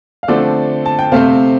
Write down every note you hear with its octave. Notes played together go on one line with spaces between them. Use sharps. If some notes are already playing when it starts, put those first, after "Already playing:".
F5
D3 F3 A3 C4 A4 D5
A5
G5
C3 A3 C4 C5 F5